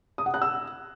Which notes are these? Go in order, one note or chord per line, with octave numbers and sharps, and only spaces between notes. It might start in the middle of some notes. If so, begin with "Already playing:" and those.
D#6
F#5
F#6
E6